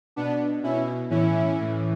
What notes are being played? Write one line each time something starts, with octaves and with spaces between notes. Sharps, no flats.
B2 B3 D4
B2 C#4 E4
A2 E3 C#4 E4
A2 E3